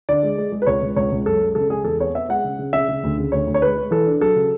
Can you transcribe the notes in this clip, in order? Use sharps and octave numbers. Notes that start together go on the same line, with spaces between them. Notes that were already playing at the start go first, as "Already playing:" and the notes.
D3 D5
G#3
G#3
G#3
B4
C#2 C#5
C#2
C#2 C#5
C#2
F#2 A4
G#3
C#3 A4
G#3 G#4
E2 A4
B3 C#5
B3 E5
G#3 F#5
C#3
C#3
C#3 E5
C#3
D2
C#3
D2 C#5
D2
C#5
G#3 B4
G#3
E3 A4
D4
F#3 A4
C#3